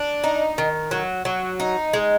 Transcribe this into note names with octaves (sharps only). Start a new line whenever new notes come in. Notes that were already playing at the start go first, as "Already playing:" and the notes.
Already playing: D4
D#4
D#3
F#3
F#3
D#4
G#3